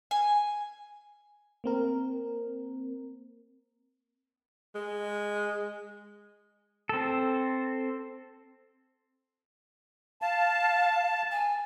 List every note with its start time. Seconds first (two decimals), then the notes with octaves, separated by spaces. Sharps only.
0.11 G#5
1.64 A#3 C4 A#4
4.75 G#3
6.89 C4 A4
10.22 F5 A5
11.31 G#5